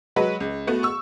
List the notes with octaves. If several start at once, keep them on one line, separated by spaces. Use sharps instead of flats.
F#3 G#3 F#4 B4
C#2
A3 B3 F#4
C#6 E6